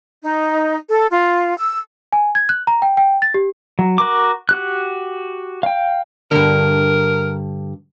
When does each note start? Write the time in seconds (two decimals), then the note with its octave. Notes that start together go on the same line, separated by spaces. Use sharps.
0.22 D#4
0.89 A4
1.11 F4
1.58 E6
2.13 G#5
2.35 G#6
2.49 F#6
2.67 A#5
2.82 G5
2.97 G5
3.22 A6
3.34 G4
3.79 F#3
3.98 F#4 A#4 D6
4.49 F#4 G4 F#6
5.63 F5 G5
6.31 G2 D3 A#4